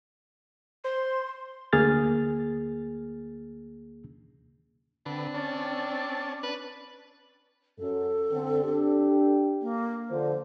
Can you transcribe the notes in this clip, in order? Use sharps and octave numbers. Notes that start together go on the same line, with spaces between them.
C5 C6
D2 A#3 G#4 F6 A6
D3 C4 D4 B4
C#4 D5 A5
D4 B4
F#2 A4
D3 C4
D4 G4
A#3
D3 F3 C5